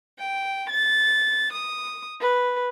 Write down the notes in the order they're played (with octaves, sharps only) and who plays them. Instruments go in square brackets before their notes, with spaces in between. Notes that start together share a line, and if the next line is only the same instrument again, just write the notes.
[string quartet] G5
A6
D#6
B4